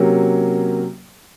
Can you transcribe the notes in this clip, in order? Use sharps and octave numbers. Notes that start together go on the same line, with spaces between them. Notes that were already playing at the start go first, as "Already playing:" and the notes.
Already playing: C3 F#3 A#3 C#4